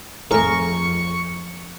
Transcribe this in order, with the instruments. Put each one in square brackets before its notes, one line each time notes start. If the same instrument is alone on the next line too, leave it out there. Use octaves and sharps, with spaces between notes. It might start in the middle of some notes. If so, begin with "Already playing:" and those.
[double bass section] F2 [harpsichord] A2 A3 [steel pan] G#4 A#4 [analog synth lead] C#6